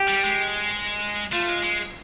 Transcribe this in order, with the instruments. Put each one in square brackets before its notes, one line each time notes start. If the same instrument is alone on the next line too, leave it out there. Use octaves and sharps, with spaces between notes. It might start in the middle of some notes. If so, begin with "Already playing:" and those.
Already playing: [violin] G4
[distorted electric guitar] G3
G#3
[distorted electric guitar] A3 [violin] F4
[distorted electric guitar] G#3
G#3